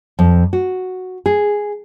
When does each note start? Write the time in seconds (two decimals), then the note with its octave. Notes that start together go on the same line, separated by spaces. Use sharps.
0.19 F2
0.53 F#4
1.26 G#4